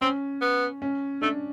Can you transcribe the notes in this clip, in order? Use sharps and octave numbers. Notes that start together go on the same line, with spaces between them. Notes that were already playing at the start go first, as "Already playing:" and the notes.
C4 C#4
B3
C#4
A3 D4